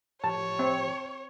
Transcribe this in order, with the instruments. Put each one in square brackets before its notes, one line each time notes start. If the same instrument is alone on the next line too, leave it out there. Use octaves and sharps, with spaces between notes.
[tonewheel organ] A2 F3 G4 [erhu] C#5 [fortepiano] A5
[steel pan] C4